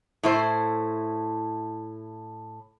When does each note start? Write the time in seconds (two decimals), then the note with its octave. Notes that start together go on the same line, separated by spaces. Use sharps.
0.23 A2 E4 C5